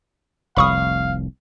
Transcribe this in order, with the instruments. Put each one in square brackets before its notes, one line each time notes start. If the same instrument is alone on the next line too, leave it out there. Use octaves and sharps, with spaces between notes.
[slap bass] F1 C2 [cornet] F5 [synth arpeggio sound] B5 C#6 D#6